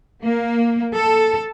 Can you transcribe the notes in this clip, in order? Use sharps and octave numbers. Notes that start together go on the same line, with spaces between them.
A#3
A4